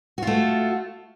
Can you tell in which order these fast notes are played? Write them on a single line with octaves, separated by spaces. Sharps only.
F#4 F4 A3